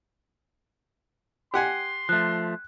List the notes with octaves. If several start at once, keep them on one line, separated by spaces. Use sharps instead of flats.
G4 F#5 G#5 C6
F3 A3 F#6